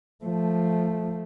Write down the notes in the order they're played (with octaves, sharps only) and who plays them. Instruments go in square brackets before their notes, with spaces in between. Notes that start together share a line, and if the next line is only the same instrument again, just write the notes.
[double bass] F3 A3